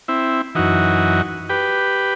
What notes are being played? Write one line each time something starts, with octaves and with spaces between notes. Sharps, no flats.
C4 E4
F#2 E3 D#4 F#4
G4 B4